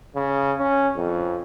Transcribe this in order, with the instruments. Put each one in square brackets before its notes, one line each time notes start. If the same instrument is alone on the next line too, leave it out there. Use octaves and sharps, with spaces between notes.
[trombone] C#3
C#4
F2